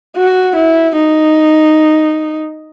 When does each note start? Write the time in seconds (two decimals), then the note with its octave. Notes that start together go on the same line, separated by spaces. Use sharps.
0.17 F#4
0.55 E4
0.95 D#4